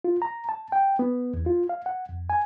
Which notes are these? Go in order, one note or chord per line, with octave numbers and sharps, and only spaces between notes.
F4
A#5
A5
G5
B3
E2
F4
F5
F#5
F2
G#5